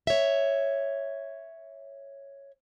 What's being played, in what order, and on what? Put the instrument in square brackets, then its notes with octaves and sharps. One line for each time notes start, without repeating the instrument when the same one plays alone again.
[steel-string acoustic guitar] C#5 E5